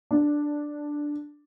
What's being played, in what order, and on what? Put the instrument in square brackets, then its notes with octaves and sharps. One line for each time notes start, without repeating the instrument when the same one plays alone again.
[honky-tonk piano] D4